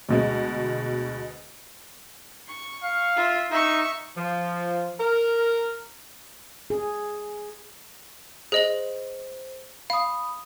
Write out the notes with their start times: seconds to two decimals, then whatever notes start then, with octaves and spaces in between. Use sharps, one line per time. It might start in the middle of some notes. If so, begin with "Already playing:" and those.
0.09 D2 B2 G#3
2.48 C#6
2.84 F5
3.16 F4 E5
3.51 D#4 E5 C#6
4.16 F3
4.99 A#4
6.70 G#4
8.52 G#4 C5 D#5 F#7
9.90 F5 B5 D#6